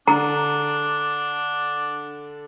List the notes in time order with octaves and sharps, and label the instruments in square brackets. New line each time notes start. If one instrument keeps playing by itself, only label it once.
[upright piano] D3 [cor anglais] D4 [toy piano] A#5